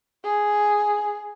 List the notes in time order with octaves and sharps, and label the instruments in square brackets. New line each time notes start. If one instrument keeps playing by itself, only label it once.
[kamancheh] G#4